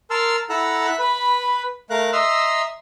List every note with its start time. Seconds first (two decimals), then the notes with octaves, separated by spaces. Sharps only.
0.11 A#4 A5 C6 E6 F6
0.50 E4 A4 F#5 A#5 E6 F#6
0.86 E5 F#6
0.99 B4 B5
1.90 A3 A#4 F5 A#5 F#6
2.13 D#5 E5 A#5 C6 E6